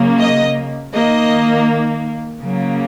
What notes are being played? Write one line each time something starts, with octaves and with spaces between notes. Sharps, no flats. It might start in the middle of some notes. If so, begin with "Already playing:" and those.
Already playing: C#3 F#3 A#3
D#5
D#3 A#3 D#5
C#3 F#3 A#3